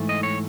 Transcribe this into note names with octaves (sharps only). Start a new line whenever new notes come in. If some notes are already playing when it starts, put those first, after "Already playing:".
Already playing: G#2 E3 A3
D#5
C#5